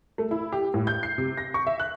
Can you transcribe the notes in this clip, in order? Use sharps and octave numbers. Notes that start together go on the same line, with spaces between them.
A3
E4
G4
A2
G6
C7
C3
A#6
C#6
E5
F#6